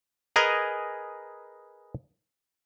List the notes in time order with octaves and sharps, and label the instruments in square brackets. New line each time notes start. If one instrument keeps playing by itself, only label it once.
[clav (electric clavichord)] G#4 A#4 B4 D#5 G#5 A#5